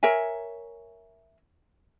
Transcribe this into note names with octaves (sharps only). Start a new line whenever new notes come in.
A#4 C#5 E5 G#5